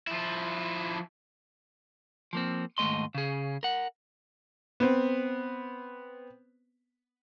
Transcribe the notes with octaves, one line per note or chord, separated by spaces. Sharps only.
F3 E4
F3 A#3 C4
D#2 G#2 G#3 A3 D#5 C6
C#3 G#4
A#4 F#5
B3 C4